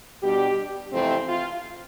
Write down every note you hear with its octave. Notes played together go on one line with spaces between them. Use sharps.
B2 G3 D4 G4
F2 C3 E3 A3 C4
F4